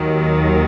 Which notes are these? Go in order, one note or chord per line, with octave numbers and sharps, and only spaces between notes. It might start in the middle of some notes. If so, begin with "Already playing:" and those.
Already playing: D#2 D#3 F#3